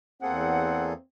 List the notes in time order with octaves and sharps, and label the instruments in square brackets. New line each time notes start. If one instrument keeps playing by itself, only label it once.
[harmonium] E2 [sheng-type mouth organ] A#3 G#4 A4 [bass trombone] C4 [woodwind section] F#5